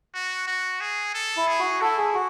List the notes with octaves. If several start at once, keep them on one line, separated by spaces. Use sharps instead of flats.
F#4
F#4
G#4
A4
E4
G#4
F#4
E4 A4
G#4
F#4